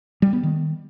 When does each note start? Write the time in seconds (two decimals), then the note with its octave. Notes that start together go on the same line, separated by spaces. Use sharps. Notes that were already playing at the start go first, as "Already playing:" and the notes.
0.22 G3
0.33 B3
0.43 D#3